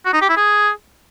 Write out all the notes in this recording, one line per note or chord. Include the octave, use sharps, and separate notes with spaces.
F#4
D#4
G4
E4
G#4